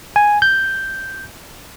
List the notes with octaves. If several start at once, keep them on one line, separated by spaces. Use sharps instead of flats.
G#5
G6